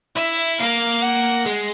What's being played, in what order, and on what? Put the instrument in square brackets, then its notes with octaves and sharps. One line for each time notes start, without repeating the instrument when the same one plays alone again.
[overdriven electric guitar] E4 [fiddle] E5
[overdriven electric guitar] A#3 [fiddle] F5
[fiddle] F#5
[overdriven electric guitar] G#3